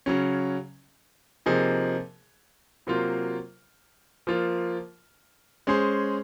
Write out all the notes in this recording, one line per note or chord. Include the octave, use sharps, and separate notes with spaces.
C#3 F#3 C#4
C3 F3 A#3 D#4 G#4
C3 F#3 A#3 F4 C5
F3 A#3 F4
G#3 C#4 G#4 C5